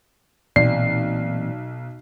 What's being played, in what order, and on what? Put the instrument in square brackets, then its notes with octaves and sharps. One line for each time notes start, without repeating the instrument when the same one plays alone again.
[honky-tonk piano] B1 [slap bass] A#2 E3 C4 [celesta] D5 [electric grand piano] C7